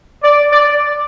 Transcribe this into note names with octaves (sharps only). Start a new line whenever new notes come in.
D5
D5